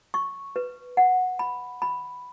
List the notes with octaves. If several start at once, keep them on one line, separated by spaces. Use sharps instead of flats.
C#6
B4
F#5
B5
B5